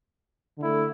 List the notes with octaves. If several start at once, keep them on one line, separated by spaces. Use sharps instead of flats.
D3 A3 E4